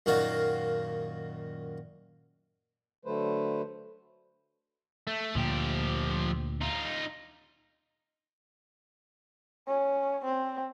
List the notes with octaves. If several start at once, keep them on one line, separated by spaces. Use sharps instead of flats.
F#2 A#2 D#3 F#4 F5
D3 F#3 A3 B4 C5
A3
D2 A#2 F3 G4
D#4 F4
C#4
C4